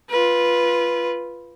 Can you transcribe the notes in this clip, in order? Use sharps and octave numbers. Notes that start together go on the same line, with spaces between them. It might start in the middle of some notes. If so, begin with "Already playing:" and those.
F4 B4